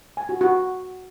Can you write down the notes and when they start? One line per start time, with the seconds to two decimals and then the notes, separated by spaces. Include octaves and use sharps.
0.17 G#5
0.29 F#4
0.41 F#4